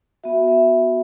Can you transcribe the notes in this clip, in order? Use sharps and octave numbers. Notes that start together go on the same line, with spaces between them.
B3 F#4 E5
E5